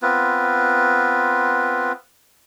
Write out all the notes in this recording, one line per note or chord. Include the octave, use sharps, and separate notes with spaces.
B3 C4 F4 B4